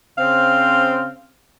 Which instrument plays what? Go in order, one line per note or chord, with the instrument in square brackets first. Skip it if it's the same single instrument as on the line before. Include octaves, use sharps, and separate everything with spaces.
[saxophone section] C#3 C4 C5 F5